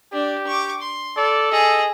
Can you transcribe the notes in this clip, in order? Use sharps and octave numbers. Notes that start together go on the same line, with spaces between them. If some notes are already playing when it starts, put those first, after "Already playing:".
D4 G4
C#6 D6
C6
A4 D5
G#4 D#5